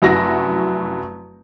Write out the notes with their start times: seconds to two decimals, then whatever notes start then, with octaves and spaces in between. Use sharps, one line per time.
0.02 F1 F#2 E4 F#4 A#6